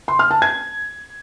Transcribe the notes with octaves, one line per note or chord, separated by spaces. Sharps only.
C6
F6
A5
G#6